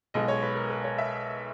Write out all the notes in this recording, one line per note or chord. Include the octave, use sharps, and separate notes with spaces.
B1 B2 G#3 D#5
C#5
B4
A#4
B4
C#5
E5